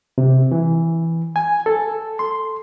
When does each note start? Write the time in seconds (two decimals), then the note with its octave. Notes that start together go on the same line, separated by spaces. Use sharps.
0.18 C3
0.52 E3
1.36 G#5
1.66 A4
2.19 C6